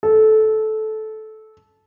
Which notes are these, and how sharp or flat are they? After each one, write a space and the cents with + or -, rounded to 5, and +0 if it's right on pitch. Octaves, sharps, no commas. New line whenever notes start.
A4 -15